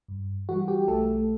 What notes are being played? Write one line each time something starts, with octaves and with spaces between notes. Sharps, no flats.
G2
E3 G3 F#4
G4
B1 A3 A4